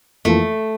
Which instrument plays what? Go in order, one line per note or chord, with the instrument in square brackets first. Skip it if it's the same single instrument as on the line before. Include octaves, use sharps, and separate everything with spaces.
[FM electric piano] F2 E3 A#3 F4 A4 [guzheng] A3